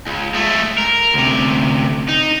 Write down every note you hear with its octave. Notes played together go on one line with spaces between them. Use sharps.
C#2
G#3 A3
A#4
D2 C3
D#4